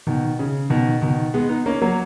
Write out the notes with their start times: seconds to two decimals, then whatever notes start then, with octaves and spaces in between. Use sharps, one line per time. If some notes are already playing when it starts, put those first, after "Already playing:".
0.07 B2 D#3
0.39 C#3
0.70 B2 D#3
1.01 B2 D#3
1.34 G#3 B3
1.49 B3 D#4
1.66 A#3 C#4
1.82 F#3 A#3